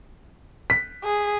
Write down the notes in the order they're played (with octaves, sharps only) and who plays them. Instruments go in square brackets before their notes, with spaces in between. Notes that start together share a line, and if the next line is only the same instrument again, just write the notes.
[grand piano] B6
[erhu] G#4